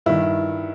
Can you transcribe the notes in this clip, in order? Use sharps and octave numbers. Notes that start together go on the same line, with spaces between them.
G2 D#3 E4